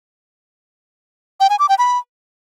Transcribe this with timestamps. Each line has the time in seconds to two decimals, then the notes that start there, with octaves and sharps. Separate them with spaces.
1.40 G5
1.50 G#5
1.59 D6
1.69 G5
1.78 B5